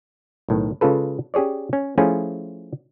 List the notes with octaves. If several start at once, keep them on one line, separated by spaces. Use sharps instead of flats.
B1 A2 D#3
C#3 G#3 F4 A4 B4
C#4 G4 G#4 C#5 D5
C#4
F3 A3 C#4 E4 F4 G#4